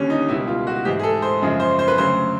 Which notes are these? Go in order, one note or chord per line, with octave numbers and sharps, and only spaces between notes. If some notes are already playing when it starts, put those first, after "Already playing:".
Already playing: D#2 D3 G3 C#4
D#4
C#2 B2 G3 E4
F4
F#4
G#2 E3 G#3 G4
G#4
A4
C5
F#2 C#3 F3 G#3
C5
C5
B4
D2 C#3 F#3 C5